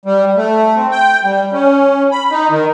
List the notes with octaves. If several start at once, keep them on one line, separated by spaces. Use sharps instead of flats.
G3
A3
C4
G5
G3
C#4
B5
D#4
D#3